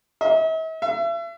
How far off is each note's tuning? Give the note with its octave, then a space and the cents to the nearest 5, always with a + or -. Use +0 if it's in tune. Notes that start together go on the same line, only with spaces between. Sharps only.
E5 -45
E5 +40